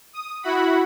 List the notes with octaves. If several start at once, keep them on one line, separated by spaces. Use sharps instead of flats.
D#6
E4 F#4 F#5 B5